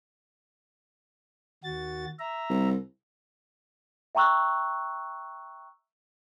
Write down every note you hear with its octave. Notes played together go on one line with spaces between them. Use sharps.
D#2 F#4 A6
E5 A#5
C2
E5 G5 A#5 C#6 E6 F#6